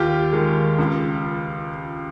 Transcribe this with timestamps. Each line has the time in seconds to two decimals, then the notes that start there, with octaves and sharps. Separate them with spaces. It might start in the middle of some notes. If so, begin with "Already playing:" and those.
Already playing: D#2 F4 G4
0.33 D#3 G#3
0.78 C#2